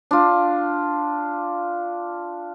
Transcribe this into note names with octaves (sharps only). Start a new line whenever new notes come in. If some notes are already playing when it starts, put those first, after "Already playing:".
D4 F4